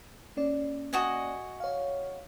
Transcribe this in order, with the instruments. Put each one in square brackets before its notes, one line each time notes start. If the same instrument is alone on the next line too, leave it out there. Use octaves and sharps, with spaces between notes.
[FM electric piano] A#3 C#4 D5
[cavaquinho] F#4 D#5 G#5
[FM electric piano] C#5 F5